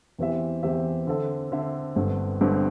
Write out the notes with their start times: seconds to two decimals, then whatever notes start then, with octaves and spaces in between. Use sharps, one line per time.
0.19 E2 E3 C4 G4 E5
0.63 E2 E3 C4 G4 E5
1.07 D3 C4 A4 E5
1.52 D3 C4 A4 E5
1.96 G1 G2 D3 C4
2.41 G1 G2 D3 C4